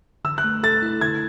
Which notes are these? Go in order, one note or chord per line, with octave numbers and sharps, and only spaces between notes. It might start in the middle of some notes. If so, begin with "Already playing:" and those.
D3 E6
F#6
A3
A4 A6
E4
D3 G#6